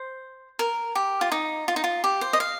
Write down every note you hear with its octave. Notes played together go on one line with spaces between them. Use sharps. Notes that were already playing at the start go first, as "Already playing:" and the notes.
Already playing: C5
A#4
G4
F4
D#4
F4
D#4
F4
G4
C5
D#5
F5